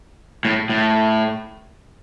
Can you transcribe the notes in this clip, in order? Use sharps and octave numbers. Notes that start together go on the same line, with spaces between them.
A2
A2